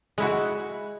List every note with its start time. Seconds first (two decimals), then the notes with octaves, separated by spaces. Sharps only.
0.18 G#3 E4 F#4